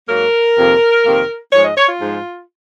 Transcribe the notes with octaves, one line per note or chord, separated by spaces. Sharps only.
G#2 F#3 A#3 A#4
F2 C3 D#3 A#3
F2 C3 D#3 A#3
G#2 F3 G#3 C#5
D#5
C#5
F4
G#2 F3 G#3